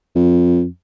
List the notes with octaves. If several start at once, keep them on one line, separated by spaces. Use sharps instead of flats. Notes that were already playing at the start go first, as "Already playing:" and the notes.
F2